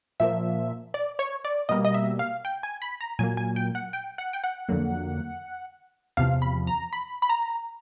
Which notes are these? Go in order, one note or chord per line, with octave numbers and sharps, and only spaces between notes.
A#2 F3 A#3 E5
D5
C#5
D5
B2 G3 A#3 D#5
D#5
E5
F5
G5
G#5
B5
A#5
A#2 F#3 A#3 G#5
G#5
G5
F#5
G5
F#5
G5
F#5
F2 D3 F#3 A#3
E2 C3 F3 F5
B5
A#5
B5
B5
A#5